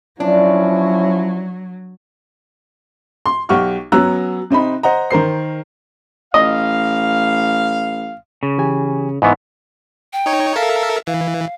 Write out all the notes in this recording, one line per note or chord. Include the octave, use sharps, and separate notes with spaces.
F3 F#3 C#4 D4 E4
C6
B1 G4 F#5 C#6 F6
F#3 B3 C#4 A#5 E6 F#6
C3 C4 D#4 B5
C5 D#5 F#5 A#5
D#3 A#4 C5 C7
A1 D#5 F5
C#3
E3 G4 G#5
G#2 E3 B3 D#5 E5 C#6
G5
D#4 C#5
A4 A#4 E5 F5
E3 F5